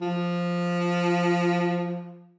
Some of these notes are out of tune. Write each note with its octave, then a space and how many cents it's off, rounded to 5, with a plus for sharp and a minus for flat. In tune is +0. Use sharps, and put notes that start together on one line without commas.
F3 +0